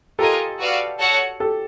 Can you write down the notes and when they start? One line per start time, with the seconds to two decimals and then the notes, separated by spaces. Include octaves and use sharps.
0.19 F4 G4 A4 A#4 D#5 G#5
0.59 F#4 B4 D5 F5
0.99 F#4 A4 C#5 F#5
1.40 G4 A4